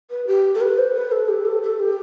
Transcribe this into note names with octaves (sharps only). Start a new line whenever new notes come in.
B4
G4
A4
B4
C5
B4
A4
G4
A4
A4
G4